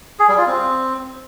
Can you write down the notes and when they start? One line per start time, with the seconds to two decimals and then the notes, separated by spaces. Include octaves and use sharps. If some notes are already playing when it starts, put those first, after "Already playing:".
0.19 G#4
0.29 G3
0.38 F4
0.47 C4